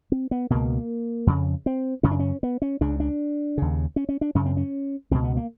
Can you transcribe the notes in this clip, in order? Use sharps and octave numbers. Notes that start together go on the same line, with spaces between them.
C4
B3
C#2 B2 A#3
F2 C#3
C4
F#2 C#3 C#4
D4
C#4
B3
C#4
C#2 C#3 D4
D4
D#2 C#3
C#4
C#4
D4
F#2 C#3 C#4
C4
C#4
C#2 B2 C4
B3
A#3